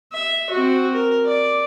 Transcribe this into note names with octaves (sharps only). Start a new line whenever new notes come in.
E5
C4 F#4
A#4
D5